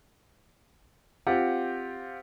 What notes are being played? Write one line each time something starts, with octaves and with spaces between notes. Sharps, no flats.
C4 F4 G4 F#5